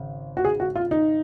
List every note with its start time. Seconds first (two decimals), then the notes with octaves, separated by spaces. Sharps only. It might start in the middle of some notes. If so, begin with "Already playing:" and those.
Already playing: G#1 C#3
0.37 F#4
0.45 G#4
0.60 F#4
0.76 F4
0.91 D#4